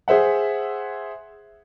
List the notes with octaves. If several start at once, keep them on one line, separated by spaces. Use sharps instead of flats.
G#4 C5 E5 F#5